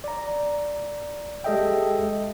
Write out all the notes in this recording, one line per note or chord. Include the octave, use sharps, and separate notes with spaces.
D5 A#5
G#3 G4 A4 D#5 E5 G5